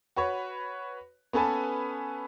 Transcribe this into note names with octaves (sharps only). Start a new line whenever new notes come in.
F#4 B4 C#5
B3 C#4 A4 B4 G#5 A5